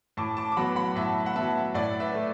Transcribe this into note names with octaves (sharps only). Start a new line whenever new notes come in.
A2 A5 D6
A5 D6
D6
F#3 B3 F#5 B5
F#5 B5
A2 E5 A5
F#5
F#3 B3 E5 A5
A2 D5 F#5
B4 E5
A3